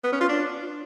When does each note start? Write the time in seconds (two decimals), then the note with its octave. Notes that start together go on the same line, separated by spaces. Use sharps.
0.04 B3
0.12 C#4
0.21 F4
0.29 D4